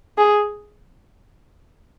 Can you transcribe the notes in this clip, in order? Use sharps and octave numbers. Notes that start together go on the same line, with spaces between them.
G#4